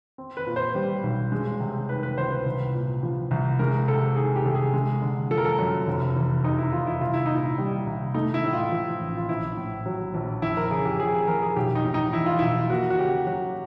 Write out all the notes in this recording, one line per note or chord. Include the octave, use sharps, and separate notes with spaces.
C4
B4
A#2
C5
G3
B1
G#3
C3
D#3 B4
B4
C#2 C5
B4
C2
A#2
F3
C2
G#3 A#4
C3 A4
D#3 G#4
G4
C2 A4
G#4
G#3
D3
F3 A4
A#4
A4
F#2
F1
E2
C3 D#4
E4
F1 F4
E4
C2 F4
E4
A#2 D#4
E4
G3
C2
A3 D#4
E4
A2
F4
F3
A1
F4
A#1 E4
A2
F#3
A#1
F2 E4
A#4
C#3 G#4
G4
F3 G#4
G#4
F2 A#4
G#4
B1 G4
D#4
A2
D#4
E3 E4
F4
B1 E4
A#3 F#4
F#4
C#3 G4
F#3 F#4